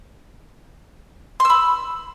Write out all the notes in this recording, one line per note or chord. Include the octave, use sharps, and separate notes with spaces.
B5 C6 E6